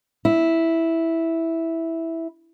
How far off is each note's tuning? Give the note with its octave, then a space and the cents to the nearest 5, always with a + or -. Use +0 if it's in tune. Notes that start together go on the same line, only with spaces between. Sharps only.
E4 -5